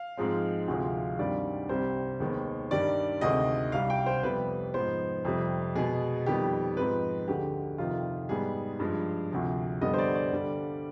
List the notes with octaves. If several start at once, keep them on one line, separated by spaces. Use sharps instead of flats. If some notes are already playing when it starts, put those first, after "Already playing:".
Already playing: F5
G#2 F3 G#3 C4
D2 C3 F3 G#3 C4
G2 D#3 G3 C4 D5
C2 C3 G3 C4 C5
D#2 D#3 G#3 B3
G2 D#3 G3 D5
D2 C3 D#3 G#3 C4 D#5
C2 C3 G3 F5
G5
C5
F2 C3 G3 B3 B4
G#2 F3 B3 C5
F2 C3 G3 C4
B2 G#3 B3 G#4
F2 D#3 G3 B3 G4
G#2 F3 C4 B4
D2 D3 G#3 G4
F2 C3 D#3 F4
G#2 G3 B3 G#4
G2 F3 G#3
D2 C3 F3
G2 D3 G3 B3 D#5
C5
D5
D5
G2 D3 G3